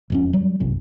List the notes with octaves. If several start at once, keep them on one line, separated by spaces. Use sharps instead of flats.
E1 F2 C#4
F#3 G3
G1 C2 F#2